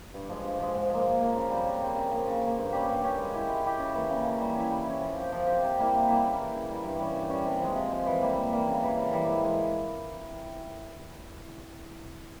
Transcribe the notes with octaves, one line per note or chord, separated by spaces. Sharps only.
G2
F3 G#3
G2
F3 G#3
G#2
F3 A#3
G#2
F3 A#3
C#3
G3 C4
C#3
G3 C4
C#3
F3 A#3
C#3
F3
A#3
G2
G3 C#4 G4
G2
G3 C#4 G4
G#3
E4 G4
G#3
E4 G4
C#3
E3 A#3
C#3
E3 A#3
G3
C#4 E4
G3
C#4 E4
F3
C4 G4
F3
C4 G4
C3
G3 A#3 E4
C3
G3 A#3 E4
C#3
E3 G3
C#3
E3 G3
G2
G3 C#4
G2
G3 C#4
C3
F3 G#3
C3
F3 G#3
E3
G3 A#3
E3
G3 A#3
C#3
E3 G3
C#3
E3 G3
G#2
E3 G#3